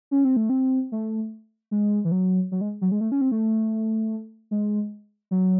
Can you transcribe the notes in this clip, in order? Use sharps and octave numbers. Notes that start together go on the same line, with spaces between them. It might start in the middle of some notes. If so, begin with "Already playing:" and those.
C#4
C4
A3
C4
A3
G#3
E3
F#3
F#3
G#3
F#3
G#3
A3
C#4
C4
A3
G#3
F#3